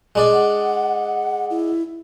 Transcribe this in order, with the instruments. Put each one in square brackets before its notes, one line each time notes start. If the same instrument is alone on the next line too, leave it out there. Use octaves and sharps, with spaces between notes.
[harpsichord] G#3 D4 D5
[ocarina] F#5
E4